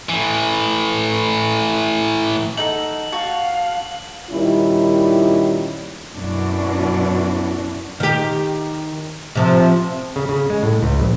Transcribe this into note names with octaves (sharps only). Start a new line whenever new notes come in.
A2 E3
D#4 A4 F#5 F#7
F#4 F5 F#5 A5
A#2 D#3 G3 C#4 E4
F#2 B2 C#4 D4 E4 F#4
D#3 G4
C3 F3
C#3
C#3
G#3
A2
C#2
A#1